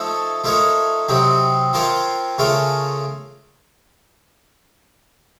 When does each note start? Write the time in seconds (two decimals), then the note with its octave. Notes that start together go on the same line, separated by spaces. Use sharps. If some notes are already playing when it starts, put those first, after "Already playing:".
Already playing: F3 A3 D#4 A4 C#5
0.44 F3 A3 D#4 A#4 C#5
1.09 C3 F#3 C4 D#4
1.73 F3 C4 F4 A#4 C#5
2.38 C#3 A3 C#4 F4 A#4